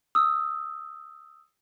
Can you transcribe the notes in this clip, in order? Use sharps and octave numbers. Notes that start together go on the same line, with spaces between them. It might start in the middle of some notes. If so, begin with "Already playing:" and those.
D#6 E6